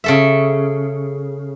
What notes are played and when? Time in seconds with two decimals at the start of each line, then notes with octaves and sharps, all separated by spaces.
0.04 C#3 A4 E5